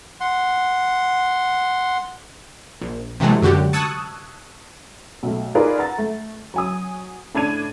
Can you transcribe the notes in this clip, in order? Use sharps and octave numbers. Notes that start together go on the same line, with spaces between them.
F#5 C6
A#1
C3 E3 F#3 G#3 A3
F#2 D3 F#4 G4
A5 C#6 D#6 E6 F#6 G#6
B1 A3
D#4 F4 G#4 A#4 B4 D5
F#5 A#5 A6
A3
F#3 G#5 D#6
A2 D4 A5 G#6 D#7